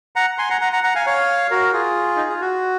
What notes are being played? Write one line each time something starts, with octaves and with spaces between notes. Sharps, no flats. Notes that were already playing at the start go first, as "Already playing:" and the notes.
F#5 A#5
G#5 C6
F#5 A#5
F#5 A#5
F#5 A#5
F#5 A#5
F5 G#5
C#5 F5
F#4 A#4
F4 G#4
D#4
F4
F#4